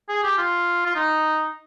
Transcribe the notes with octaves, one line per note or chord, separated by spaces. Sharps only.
G#4
G4
F4
F4
D#4